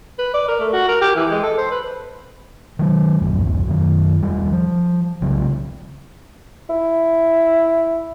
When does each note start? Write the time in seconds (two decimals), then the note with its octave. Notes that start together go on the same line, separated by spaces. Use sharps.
0.19 B4
0.34 D5
0.48 A#4
0.60 A3
0.73 F#4
0.89 A#4
1.02 G4
1.16 E3
1.30 G#3
1.43 A4
1.58 C5
1.71 B4
2.79 D#3 F#3
3.21 D1 A#1 F#2
3.67 F#2 D#3
4.22 E1 G3
4.52 F3
5.22 C2 C#3 F#3 C4
6.70 E4